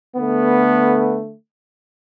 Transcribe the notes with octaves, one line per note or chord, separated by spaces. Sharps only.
D3 A3 B3